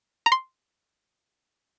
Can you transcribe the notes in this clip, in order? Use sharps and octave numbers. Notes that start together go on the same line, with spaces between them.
A#5
C6